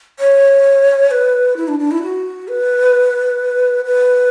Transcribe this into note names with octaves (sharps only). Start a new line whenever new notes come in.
C#5
B4
E4
D4
D4
E4
F#4
B4
B4